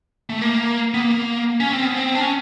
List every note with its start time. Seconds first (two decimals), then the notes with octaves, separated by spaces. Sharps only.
0.30 A3
0.41 A#3
0.94 B3
1.01 A#3
1.60 C#4
1.73 C4
1.85 B3
1.96 C4
2.15 D4
2.21 C#4